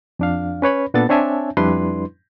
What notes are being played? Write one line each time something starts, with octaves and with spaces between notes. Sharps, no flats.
F2 D4 F5
C#4 B4 C#5 B5
A#2 B3 D4 A4 A6
C4 D4 C#5 E5 G#5 A5
F2 G3 D4 E4 B4 C6